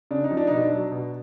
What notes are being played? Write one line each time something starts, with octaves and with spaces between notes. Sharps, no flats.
C#3 D4
D#4
F3
D4
B2 D#4
D4
F#3
B2